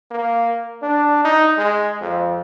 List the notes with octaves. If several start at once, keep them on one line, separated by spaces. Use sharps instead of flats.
A#3
D4
D#4
G#3
F2